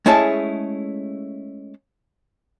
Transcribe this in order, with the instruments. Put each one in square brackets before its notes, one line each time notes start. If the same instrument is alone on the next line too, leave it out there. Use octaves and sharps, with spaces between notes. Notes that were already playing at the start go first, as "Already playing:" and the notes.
[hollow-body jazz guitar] G#3 A3 C#4 E4 G#4 A5